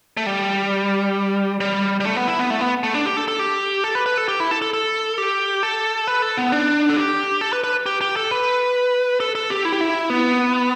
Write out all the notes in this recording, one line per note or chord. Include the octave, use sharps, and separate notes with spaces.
A3
G3
G3
G3
A3
B3
E4
B3
A3
B3
A3
D4
G4
A4
A4
G4
A4
B4
B4
A4
G4
E4
A4
A4
A4
G4
A4
B4
A4
B3
D4
A4
G4
A4
B4
B4
G4
G4
A4
B4
A4
A4
G4
E4
G4
E4
B3